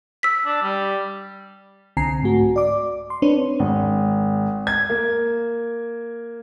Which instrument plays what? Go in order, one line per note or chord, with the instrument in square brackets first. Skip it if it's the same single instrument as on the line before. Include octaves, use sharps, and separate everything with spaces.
[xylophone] E6 B6
[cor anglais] D4
G3
[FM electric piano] C2 D3 C4 G#5 A#5 C7
G#2 A3 F#4
D5 D6
C6
C4 D4 B4 C#5
[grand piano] G#1
G#6
A#3